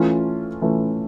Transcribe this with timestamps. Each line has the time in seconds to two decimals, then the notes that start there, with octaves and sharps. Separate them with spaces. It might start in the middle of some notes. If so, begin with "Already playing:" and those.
Already playing: E3 A3 C#4 F4
0.62 E3 A3 C#4 F4